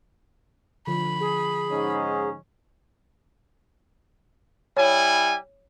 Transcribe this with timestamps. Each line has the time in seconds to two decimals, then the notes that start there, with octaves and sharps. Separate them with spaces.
0.87 D3 F3 B5
1.20 G#4
1.70 G#2 C#4 D#4
4.77 G3 E4 C#5 G#5